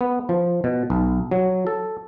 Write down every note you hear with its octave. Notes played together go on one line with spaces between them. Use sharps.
B3
F3
B2
B1
F#3
A4